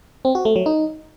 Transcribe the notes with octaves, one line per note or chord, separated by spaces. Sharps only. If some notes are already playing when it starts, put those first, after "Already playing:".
C4
F#4
A3
F#3
D#4